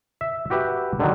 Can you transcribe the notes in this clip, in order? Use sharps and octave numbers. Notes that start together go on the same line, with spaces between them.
E5
F#4 G4 B4 E5
D3 D#3 F#3